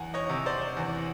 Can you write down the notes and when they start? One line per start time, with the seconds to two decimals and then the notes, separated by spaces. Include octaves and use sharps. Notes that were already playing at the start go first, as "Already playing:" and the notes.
Already playing: E2 F#5 G#5
0.14 C#5 D#5
0.29 C3
0.46 C5 D5
0.77 E2